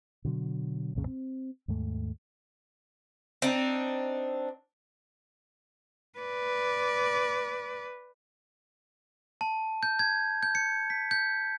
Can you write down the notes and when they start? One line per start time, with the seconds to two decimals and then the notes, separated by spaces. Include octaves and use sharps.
0.25 B2 D3 F#3
0.95 B1 F2 A#2 C#3
1.07 C4
1.68 D#2 G#2 A3
3.42 C4 D4 D#4
6.19 B4 D5
9.41 A5
9.83 G6
9.99 G#6
10.43 G6
10.55 C#7
10.90 B6
11.11 G6